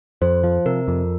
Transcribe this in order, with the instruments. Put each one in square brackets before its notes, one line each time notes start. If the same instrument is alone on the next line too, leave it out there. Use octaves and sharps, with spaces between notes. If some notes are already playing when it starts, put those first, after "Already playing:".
[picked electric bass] F2 [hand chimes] C5
[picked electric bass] F3
[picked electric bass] C3 [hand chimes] A#4
[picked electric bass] F2